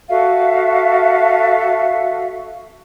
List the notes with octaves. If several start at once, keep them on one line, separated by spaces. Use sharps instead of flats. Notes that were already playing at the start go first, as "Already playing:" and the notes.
F#4 A4 E5 F5